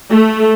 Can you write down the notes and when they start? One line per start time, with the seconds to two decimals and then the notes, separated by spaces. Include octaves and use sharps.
0.10 A3